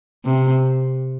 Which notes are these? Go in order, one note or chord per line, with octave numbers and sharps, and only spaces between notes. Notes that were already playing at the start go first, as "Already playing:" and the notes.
C3